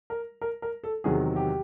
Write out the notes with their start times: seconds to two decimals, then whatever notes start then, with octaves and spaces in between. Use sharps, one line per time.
0.10 A#4
0.42 A#4
0.62 A#4
0.84 A4
1.04 E2 C3 D#3 F#3 G#4
1.36 G4